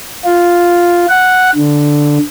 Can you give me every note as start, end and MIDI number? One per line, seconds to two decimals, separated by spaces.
0.25 1.06 65
1.09 1.50 78
1.55 2.18 50